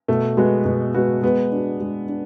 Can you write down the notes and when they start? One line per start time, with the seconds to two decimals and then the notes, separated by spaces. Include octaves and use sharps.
0.08 B2 A3
0.37 G#3 B3 F#4
0.65 B2
0.95 G#3 B3 F#4
1.23 G#3 B3
1.52 D4 F#4
1.80 G#3
2.09 D4